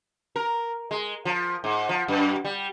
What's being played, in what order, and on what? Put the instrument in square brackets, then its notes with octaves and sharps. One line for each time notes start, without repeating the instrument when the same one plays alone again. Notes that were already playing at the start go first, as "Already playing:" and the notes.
[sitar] A#4
G#3
F3
G#2
F3
F#2
G3